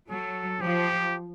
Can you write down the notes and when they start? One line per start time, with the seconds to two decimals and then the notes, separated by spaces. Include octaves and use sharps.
0.10 F#3 A4
0.61 F3 G4